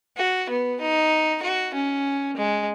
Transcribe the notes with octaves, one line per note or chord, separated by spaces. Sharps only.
F#4
B3
D#4
F#4
C#4
G#3